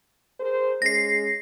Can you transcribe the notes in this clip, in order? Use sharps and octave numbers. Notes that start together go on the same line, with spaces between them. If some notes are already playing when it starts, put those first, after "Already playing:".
G#4 A#4 C5
G#3 C#4 G#4 A#6 C7